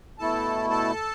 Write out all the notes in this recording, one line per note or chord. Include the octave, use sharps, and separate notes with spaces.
B2 A3 E4 A4 A5
A4 A5